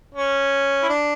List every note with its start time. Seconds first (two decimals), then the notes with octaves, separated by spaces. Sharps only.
0.15 C#4
0.83 E4
0.89 D4